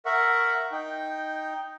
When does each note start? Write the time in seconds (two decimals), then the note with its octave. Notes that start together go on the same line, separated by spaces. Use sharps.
0.05 A#4 E5 F#5 C#6
0.72 D#4 G5